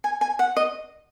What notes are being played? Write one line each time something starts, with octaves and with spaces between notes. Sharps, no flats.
G#5
G#5
F#5
D#5